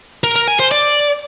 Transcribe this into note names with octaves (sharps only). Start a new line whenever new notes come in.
A#4
A#4
G#5
C5
D5